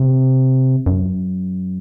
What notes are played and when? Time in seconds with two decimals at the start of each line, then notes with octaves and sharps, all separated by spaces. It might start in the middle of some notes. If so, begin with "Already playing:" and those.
Already playing: C3
0.86 F#2